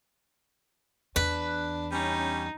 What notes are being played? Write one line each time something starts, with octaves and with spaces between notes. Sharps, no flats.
E2 D4 B4
G3 C#4 D#4